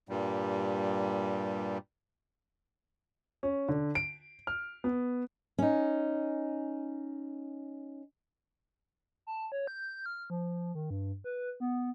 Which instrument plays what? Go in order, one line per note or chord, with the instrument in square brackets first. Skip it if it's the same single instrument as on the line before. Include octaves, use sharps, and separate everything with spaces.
[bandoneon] G2 A#2 G3
[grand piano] C#4
D3
D7
F6
B3
[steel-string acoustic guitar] C#4 D#4
[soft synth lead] A5
C#5
G6
F6
F3
D#3
G2
B4
B3